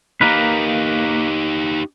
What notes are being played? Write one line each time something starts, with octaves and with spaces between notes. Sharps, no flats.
A#3 D#4 G4 A#4 B4